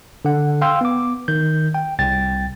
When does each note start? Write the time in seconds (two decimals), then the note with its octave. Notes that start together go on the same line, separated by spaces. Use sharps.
0.25 D3 F#5
0.62 F5 G5 C6 E6
0.81 B3 D6
1.28 D#3 G6
1.75 G5
1.99 C2 G5 A6